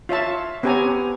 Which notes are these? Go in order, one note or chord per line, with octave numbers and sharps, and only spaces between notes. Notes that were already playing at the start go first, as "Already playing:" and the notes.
F4 C#5 E5 A5
B3 C4 G4 C#5 G#5 A#5